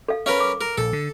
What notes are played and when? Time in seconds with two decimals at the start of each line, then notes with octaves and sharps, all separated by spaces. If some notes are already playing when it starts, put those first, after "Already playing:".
0.08 A4 F5
0.26 C#4 A#4 B4 F5
0.40 D6
0.61 A#4
0.78 A#1 A4
0.93 D3